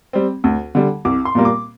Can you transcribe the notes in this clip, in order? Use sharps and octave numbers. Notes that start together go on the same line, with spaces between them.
G3 C4
D2
D3 G3
C2 D6
C6
A#2 G3 A#3
D6